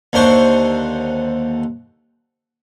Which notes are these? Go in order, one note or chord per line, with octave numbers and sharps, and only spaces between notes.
D#2 D3 C5 C#6